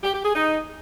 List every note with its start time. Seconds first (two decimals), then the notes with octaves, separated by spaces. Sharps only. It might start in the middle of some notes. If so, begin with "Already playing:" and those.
0.04 G4
0.14 G4
0.25 G#4
0.35 D#4